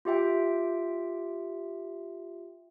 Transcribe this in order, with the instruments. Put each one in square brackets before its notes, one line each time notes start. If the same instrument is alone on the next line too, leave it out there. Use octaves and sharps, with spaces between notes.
[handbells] F4 G4 E5 G5